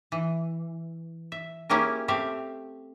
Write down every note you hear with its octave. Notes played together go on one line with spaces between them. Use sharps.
E3
E5
A#3 C#4 E4 G4 G#4 A#4
A3 C4 G4 E5 F5